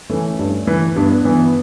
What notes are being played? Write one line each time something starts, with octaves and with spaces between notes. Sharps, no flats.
E3 A3 C#4
G2
E3
G2 B3 D4
E3 B3